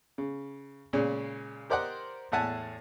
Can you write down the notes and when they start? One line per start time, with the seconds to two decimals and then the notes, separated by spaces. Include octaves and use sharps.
0.18 C#3
0.93 A#2 C#3 G#3 C#4
1.70 G4 A#4 C5 D5 D#5 F#5
2.32 E2 A2 E5 F#5 G#5 A5